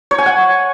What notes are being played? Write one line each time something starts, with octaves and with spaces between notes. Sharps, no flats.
C#5
G#5
F#5